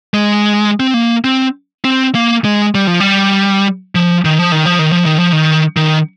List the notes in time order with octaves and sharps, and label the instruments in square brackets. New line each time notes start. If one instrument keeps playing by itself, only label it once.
[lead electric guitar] G#3
C4
A#3
C4
C4
A#3
G#3
G3
F3
G3
F3
D#3
F3
D#3
F3
D#3
F3
D#3
F3
D#3
D#3